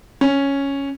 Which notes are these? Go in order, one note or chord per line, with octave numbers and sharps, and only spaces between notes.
C#4